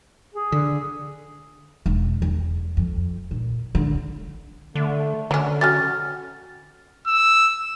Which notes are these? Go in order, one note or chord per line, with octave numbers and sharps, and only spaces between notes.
G#4
D3
E1
E2
F2
A#2
D3
D3 A3
D3 F#3 C#4
F#3 C#4 F#4 G4 F6 A6
E6